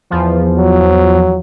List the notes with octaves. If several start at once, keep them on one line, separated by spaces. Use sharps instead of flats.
E2 F3
F#3